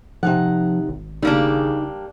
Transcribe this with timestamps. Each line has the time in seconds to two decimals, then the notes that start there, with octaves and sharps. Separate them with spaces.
0.23 C3 F3 D#4 F#5
0.88 G#1
1.22 C#3 G3 A#3 D4 D#4